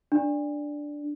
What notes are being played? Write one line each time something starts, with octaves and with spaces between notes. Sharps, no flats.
D4